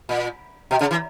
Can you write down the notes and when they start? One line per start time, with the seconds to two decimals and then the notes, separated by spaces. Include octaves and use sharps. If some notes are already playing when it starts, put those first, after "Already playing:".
0.09 A#2
0.71 B2
0.81 C#3
0.91 E3